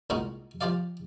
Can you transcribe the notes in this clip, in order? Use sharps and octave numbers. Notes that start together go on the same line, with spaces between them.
C2 A#2 G#3 D#4 F#4
F3 F4 G4 D5 F5